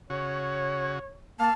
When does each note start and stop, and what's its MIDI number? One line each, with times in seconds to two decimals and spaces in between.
0.10 0.99 49
0.10 0.99 66
0.10 1.22 73
1.40 1.50 58
1.40 1.54 77
1.40 1.53 81